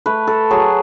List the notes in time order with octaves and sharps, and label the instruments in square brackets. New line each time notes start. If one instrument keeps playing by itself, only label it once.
[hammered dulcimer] A3 B4
A4
F#3 G#4